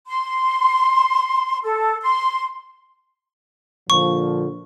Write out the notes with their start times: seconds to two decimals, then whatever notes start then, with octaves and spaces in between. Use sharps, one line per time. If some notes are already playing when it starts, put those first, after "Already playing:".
0.07 C6
1.63 A4
2.02 C6
3.90 A#2 D3 F3 C#6